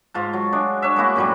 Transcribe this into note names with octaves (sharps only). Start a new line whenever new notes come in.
G#2 F4 A5
F#3
G#3 D4
D4 C#5 E5
G#3 A#3 E4 F#4
F#2 A2 F#3 G3